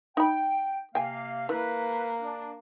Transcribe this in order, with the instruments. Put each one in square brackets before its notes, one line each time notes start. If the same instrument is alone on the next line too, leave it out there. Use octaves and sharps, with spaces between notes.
[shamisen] D#4 B5 [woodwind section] G5
[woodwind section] C3 A#3 F5 [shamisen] G5 G#5
[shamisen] E3 [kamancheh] A#3 [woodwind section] B4
[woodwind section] D4